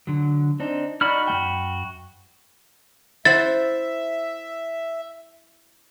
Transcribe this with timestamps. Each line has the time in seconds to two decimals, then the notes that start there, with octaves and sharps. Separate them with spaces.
0.07 D3 F#3
0.60 C4 D4 D#4
1.01 D#4 F#4 D5 D#5 B5 F6
1.27 F#2 G#3 G5
3.25 E4 C5 E5 F#5 A6